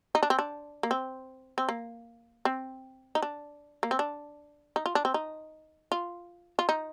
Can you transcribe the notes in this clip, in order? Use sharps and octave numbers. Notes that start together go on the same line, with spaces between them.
D#4
D4
C4
D4
A#3
C4
C4
A#3
C4
D#4
D4
A#3
C4
D4
D#4
F4
D4
C4
D#4
F4
F4
D#4